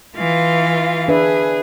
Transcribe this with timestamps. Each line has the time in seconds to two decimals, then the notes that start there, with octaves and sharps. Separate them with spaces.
0.16 E3 F4 F5
1.08 D4 G#4 B4 E5